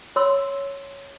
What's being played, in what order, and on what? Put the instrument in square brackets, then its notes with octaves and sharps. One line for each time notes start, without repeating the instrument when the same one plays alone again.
[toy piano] C#5 C6 E6